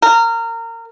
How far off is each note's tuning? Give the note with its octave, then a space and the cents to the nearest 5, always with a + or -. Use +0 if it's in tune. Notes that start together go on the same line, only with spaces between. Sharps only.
A#4 -25